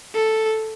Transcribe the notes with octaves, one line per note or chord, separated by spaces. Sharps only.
A4